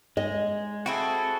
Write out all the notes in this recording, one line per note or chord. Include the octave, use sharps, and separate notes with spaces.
G#3 D#5
C4 E4 F#4 G#4 A4